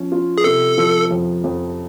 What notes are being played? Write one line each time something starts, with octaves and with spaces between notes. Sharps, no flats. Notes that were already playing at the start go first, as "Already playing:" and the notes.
Already playing: F3 C#4
F4
G#4
C3 A4
F3
F2
F2